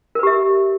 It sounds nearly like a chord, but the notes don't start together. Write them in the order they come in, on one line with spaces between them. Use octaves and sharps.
A#4 B4 G4 E5